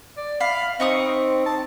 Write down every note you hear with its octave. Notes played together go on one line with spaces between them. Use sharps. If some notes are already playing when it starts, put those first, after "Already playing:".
D5
F5 B5
C4 D#4 C#6 D#6
A5